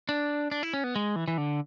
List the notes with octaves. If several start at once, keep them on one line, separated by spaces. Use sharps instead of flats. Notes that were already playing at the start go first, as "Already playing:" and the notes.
D4
D4
E4
C#4
B3
G#3
E3
E3
D3